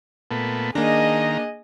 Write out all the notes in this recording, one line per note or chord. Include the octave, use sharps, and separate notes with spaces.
A#2 A3 B3
D#3 A#3 D4 G#4 D#5 A#5